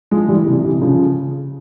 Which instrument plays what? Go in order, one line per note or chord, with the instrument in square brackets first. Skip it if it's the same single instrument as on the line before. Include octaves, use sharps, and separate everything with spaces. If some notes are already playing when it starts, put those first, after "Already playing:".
[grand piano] F3 G#3
E3 G3
C3 E3
C3 E3
C#3 F3